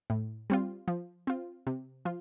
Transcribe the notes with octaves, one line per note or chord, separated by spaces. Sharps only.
A2
G3 C4 F4
F3
C4 F4
C3
F3 F4